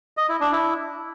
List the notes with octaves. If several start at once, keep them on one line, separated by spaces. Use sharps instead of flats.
D#5
E4
D4
E4